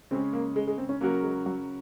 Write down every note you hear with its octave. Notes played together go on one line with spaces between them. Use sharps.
C#3 G#3 C4 C#4 G#4
A#3
G#3
G#3
C4
C#4
C#3 F#3 A#3 C#4 F#4 A#4
G#3
F#3